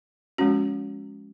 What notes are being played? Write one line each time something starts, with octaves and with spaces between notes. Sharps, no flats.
F3 G#3 C#4 F#4